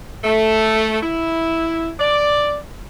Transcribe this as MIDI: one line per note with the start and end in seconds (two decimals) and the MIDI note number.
0.24 0.98 57
1.03 1.89 64
1.99 2.57 74